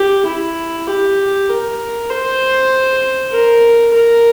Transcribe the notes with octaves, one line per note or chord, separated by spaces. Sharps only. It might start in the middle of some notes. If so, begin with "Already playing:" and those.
Already playing: G4
E4
G4
A#4
C5
A#4
A#4